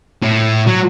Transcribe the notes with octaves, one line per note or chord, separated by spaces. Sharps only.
A2
F#3